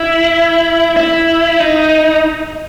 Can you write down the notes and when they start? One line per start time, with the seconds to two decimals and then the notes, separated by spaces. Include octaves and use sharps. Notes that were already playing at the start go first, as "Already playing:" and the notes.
Already playing: E4
0.97 E4
1.60 D#4